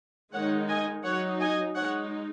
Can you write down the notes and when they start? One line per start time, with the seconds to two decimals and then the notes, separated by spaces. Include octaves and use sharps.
0.33 D#3 G#3 D#4 C#5 F#5
0.68 D#5 G#5
1.04 F#3 D#4 C#5 F#5
1.40 D#5 G#5
1.76 G#3 D#4 C#5 F#5